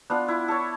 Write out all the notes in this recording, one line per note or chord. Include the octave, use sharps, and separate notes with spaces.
B3 D4 F4
E4
A4 C#5